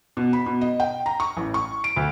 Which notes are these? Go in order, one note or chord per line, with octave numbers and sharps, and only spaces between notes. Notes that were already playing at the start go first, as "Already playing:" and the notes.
B2
B5
B2
D#5
G5
A#5
C#6
A1
C#6
D7
D2